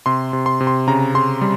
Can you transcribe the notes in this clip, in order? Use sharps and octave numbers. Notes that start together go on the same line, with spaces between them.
C3 C6
C3
C6
C3
C6
C#3 A#5
C#3 C6
G3